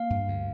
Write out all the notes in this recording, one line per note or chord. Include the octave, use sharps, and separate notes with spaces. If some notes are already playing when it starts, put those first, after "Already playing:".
Already playing: A#3 F5
G2
D2